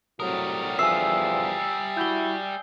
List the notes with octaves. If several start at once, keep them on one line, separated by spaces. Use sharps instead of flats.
A2 C3 F#3 G3 A#4 D#6
E2 D3 F3 E5 G#5 C7
E4 F#4 G6 G7